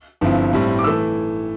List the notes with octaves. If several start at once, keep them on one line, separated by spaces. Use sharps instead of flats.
G1 G2 F3 C4 E4
A2 G3 C4 E4
D6
E3 A3 E4 E6